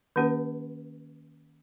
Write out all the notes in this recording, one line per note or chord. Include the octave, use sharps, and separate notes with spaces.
D#3 A#3 C#4 G4 B4